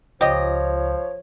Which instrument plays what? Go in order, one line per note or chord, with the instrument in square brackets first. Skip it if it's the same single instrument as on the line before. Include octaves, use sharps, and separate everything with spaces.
[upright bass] C#2 [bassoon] F3 [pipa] G4 D#5 [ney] C#5